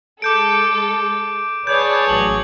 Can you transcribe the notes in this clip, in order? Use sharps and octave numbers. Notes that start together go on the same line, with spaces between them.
G#3 A4 D6 G6 D7
G#4 B4 C#5 D5 A5 G6
A1 F#3 F#7